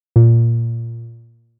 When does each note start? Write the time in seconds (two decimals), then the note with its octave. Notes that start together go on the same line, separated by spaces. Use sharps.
0.16 A#2